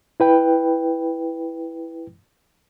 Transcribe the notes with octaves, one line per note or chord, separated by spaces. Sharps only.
E4 B4 G5